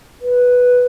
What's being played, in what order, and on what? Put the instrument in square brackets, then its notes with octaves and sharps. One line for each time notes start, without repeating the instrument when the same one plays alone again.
[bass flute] B4